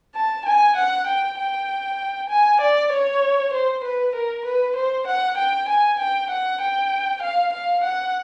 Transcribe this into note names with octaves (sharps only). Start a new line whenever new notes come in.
A5
G#5
F#5
G5
G5
G#5
D5
C#5
C5
B4
A#4
B4
C5
F#5
G5
G#5
G5
F#5
G5
F5
F5
F#5